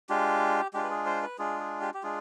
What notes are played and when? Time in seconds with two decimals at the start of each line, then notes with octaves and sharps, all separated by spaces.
0.09 G#3 D4 F4 G4
0.74 G#3 D4 F4 G4
0.83 B4
0.91 G#4
1.06 C5
1.22 B4
1.39 G#3 D4 F4 G#4
1.60 G#4
1.81 G4
1.94 G4
2.03 G#3 D4 F4 G#4